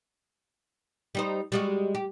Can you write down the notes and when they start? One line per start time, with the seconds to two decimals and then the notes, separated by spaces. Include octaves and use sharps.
1.15 G3 D#4 C5
1.52 G3 G#3 F#4
1.95 G4